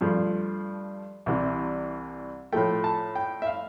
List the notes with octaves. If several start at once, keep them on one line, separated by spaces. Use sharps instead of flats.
G2 F3 A3
C2 C3 E3 G3
A2 F3 A3 G5
A5
G5
E5
F5